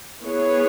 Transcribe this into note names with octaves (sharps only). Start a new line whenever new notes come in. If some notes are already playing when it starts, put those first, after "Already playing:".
B3 E4 G#4 C#5